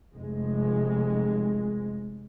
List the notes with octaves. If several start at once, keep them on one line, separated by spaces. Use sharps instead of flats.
F1 G#3